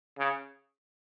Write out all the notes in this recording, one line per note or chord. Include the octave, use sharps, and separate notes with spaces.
C#3